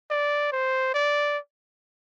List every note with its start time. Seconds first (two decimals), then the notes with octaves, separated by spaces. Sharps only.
0.11 D5
0.52 C5
0.94 D5